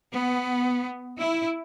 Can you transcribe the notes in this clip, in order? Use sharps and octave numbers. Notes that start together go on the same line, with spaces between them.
B3
E4